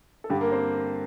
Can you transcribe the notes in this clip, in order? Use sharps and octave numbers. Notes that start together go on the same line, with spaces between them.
A4
G2 D3 G3 G4
A#3 A#4
C4 C5